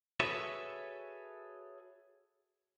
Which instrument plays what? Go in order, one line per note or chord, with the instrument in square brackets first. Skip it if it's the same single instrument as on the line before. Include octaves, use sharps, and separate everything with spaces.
[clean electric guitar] F#4 G#4 A4 B4 C#5 E5